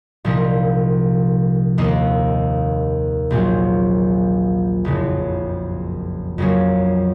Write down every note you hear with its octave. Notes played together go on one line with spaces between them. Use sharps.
C2 A#2 F3 A#3 D#4
D#2 D#3 A#3 D#4
A#1 A#2 F#3 C4
F#1 F2 C#3
F2 C#3 F#3 A#3 C#4